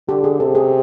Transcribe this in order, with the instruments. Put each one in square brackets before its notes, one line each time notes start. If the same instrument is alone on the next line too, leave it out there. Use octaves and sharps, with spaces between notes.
[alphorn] D3 [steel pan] G4
[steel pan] G#4
[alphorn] C3 [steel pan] A4
[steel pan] G#4